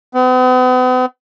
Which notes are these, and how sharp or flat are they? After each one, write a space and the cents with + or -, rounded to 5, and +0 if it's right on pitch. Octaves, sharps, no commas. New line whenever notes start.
B3 +45